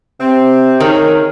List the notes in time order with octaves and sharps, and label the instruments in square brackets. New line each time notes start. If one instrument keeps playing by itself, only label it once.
[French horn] C3 [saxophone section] C4
[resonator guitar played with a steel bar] D#3 [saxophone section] G#4 C#5 [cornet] A#4